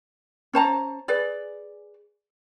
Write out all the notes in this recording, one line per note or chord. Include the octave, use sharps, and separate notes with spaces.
C#4 C5 A5 A#5
G#4 B4 D5